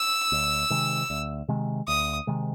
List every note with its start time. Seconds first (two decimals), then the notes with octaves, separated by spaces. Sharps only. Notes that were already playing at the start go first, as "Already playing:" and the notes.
Already playing: E6
0.32 D2
0.70 C3 D#3 G#3
1.10 D2
1.49 C3 D#3 G#3
1.88 D2 D#6
2.27 C3 D#3 G#3